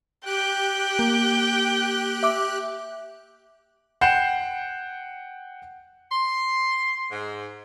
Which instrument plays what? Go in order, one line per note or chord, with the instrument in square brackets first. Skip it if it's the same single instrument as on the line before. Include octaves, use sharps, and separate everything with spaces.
[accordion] G4 F#6 [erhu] G5
[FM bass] A#3
[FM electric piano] E5 D6
[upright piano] F#5 G5 G6 C7 E7
[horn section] C6
G#2